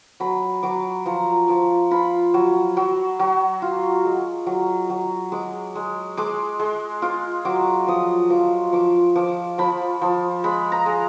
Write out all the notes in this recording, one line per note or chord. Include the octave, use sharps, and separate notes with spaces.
F#3 B5
F#3 D6
F3 A#5
F3 D6
F4 B5
F#3
F#3
F#3
F4
G#3
F#3
F#3
G#3 D6
G#3
G#3 D6
G#3
F4 D6
F#3 D6
F3 D#6
F3 D6
F3 D6
F3 D6
F3 B5
F3
G#3 B5
A#5
G#3